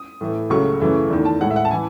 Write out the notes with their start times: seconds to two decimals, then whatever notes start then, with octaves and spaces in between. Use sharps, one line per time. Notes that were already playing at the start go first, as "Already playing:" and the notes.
Already playing: D#6
0.21 A2 E3 A3
0.50 C#2 C#3 F#3 A3 C#6
0.80 F#2 C#3 E3 A3
1.10 E2 D#3 A3
1.25 A5
1.40 A2 G#3 F#5
1.50 E5
1.56 F#5
1.65 A5
1.71 E3 G#5